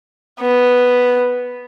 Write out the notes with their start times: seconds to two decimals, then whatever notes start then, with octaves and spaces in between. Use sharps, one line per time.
0.41 B3